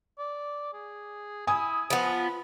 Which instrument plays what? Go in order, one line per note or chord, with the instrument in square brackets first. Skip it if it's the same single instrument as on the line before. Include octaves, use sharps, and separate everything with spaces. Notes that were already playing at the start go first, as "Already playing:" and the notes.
[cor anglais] D5
G#4
[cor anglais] E4 [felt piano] G#5 D#6
[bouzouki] F3 B3 [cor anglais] B4